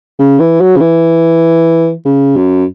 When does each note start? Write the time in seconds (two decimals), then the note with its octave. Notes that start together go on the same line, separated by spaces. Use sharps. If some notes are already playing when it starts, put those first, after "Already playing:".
0.19 C#3
0.40 E3
0.61 F#3
0.76 C#3
0.81 E3
2.05 C#3
2.37 F#2